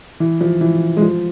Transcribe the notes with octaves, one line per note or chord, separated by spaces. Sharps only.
E3
F3
E3
G#3
F3